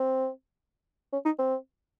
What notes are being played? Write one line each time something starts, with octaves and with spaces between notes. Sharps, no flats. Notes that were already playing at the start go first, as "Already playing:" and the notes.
Already playing: C4
C#4
D#4
C4